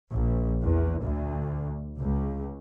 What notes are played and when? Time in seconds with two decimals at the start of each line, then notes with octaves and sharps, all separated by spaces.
0.12 A#1
0.62 E2
1.01 D2
2.00 C#2